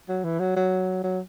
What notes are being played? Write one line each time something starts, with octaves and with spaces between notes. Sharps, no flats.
F#3
E3
F#3
F#3
F#3